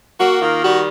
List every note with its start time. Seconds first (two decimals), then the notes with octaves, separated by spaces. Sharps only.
0.19 A#3 F#4
0.41 D#3 F4
0.63 G3 F#4